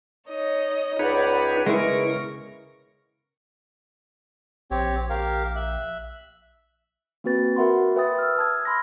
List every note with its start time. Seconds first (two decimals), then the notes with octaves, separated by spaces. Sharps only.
0.29 D#4 C#5 D#5
0.99 C#2 D#4 B4 C#5 D5 F#5 B5
1.33 D5
1.66 C#3 G#3 B3 E4 A#4 C#6
4.71 A#1 C4 G4 C#5
5.10 G4 A#4 F5
5.56 E5 F#6
7.24 A#3 C4 F#4 B4 A6
7.56 F#4 A#4 E5 F#5 B5 C6
7.96 B4 E5 G5 B5 D#6 A6
8.19 E6 F6
8.38 A5 D#6 E6 G#6
8.65 A5 B5 C6 F6 G#6 A#6